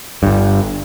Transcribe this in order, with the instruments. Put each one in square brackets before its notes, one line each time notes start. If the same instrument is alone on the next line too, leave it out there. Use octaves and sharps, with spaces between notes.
[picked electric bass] G1 G2